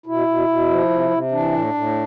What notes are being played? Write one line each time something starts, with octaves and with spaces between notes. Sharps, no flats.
B2 E4
B2
B2
F3
C3
C3
E3 D4
A2
A2